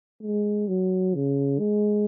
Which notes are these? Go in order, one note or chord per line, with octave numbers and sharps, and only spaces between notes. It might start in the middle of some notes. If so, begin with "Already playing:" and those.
G#3
F#3
C#3
G#3